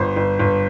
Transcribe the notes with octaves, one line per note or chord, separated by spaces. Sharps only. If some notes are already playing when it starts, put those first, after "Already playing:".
Already playing: G1 C5
G1
G1